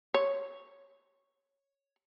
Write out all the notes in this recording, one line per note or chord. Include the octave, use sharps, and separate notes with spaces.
C#5